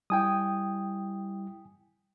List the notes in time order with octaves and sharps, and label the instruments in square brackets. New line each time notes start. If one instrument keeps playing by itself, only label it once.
[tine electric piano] G3 E4 [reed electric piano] G5 G#5 D#6